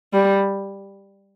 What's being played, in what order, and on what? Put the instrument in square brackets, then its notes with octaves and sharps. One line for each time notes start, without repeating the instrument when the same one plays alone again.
[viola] G3